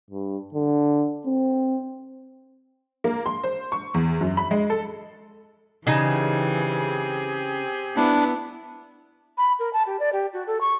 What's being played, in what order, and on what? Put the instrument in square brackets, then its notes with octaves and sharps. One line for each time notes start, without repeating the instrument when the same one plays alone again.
[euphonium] G2
D3
C4
[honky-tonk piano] A#3
C6
C5
C#6
E2
F#2
B5
G#3
A4
[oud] C#3 D#4 [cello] E3 [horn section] C4 G4 G#4
[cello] B3 E4 [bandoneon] D4
[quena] B5
A#4
A5
G4
D5
G4
F#4
A4
C#6